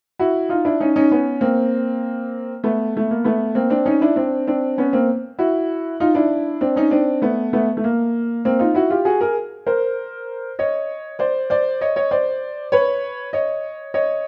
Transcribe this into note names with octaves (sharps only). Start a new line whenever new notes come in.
E4 F#4
D#4 F4
D4 E4
C#4 D#4
C#4 D#4
B3 C#4
A#3 C4
A3 B3
A3
A#3
A3 B3
A#3 C4
C4 D4
C#4 D#4
D4 E4
C4 D4
C4 D4
B3 C#4
A#3 C4
E4 F#4
D#4 F4
D4 E4
C4 D4
C#4 D#4
C4 D4
A3 B3
A3 B3
A3
A#3
A#3 C4
D#4 F4
E4 F#4
F4 G4
F#4 G#4
G#4 A#4
A#4 C5
C#5 D#5
C5 D5
C5 D5
C#5 D#5
C#5 D#5
C5 D5
B4 C#5
C#5 D#5
C#5 D#5